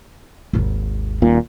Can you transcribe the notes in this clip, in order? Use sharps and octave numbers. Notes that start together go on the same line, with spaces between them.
G#1 D#2
D#1 A#2